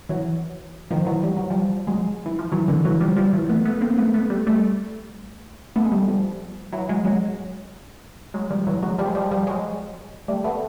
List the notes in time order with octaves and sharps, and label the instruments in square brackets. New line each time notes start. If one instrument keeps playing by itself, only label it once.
[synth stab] E3 F#3
D#3 F3
E3 F#3
G3
F#3
F3 G3
F#3 G#3
E3
F3
E3 F#3
D3 E3
E3 F#3
F3 G3
F3 G3
E3 F#3
A3 B3
A3 B3
A#3 C4
A3 B3
A3 B3
G3 A3
G3 A3
A3 B3
G#3
G3 A3
F3 G3
E3 F#3
F#3 G#3
F#3 G#3
F#3 G#3
F3 G3
E3 F#3
F#3 G#3
F3 G3
G#3
F3 G3
F3 G3
F#3 G#3
G3 A3
A3 B3